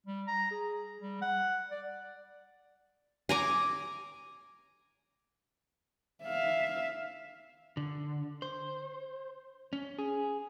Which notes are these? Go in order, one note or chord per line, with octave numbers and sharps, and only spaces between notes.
G3
A#5
G#4
G3
F#5
D5
G#5 A#5 D6
E5 F5
D3
C5
C#4
G#4